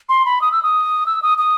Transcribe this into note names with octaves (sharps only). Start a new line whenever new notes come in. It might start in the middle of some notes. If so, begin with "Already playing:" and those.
C6
B5
D#6
E6
D#6
E6
D#6
D#6